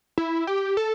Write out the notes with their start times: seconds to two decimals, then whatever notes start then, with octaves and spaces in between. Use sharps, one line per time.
0.18 E4
0.47 G4
0.77 A4